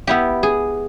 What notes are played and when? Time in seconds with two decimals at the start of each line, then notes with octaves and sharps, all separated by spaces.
0.07 B3 E4 G4
0.43 G#4